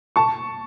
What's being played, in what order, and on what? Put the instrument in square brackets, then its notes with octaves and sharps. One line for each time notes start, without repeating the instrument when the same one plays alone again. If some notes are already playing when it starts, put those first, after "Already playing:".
[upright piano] A5 C#6